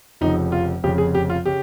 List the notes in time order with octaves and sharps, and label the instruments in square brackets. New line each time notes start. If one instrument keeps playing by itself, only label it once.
[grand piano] F1 F2 C#3 D#4
F4
F1 F2 C#3 G4
G#4
G4
F4
C#3 G4